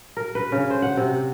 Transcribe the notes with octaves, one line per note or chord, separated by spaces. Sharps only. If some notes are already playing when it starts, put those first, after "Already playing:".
A#4
B4
C#3
C5
F#5
C3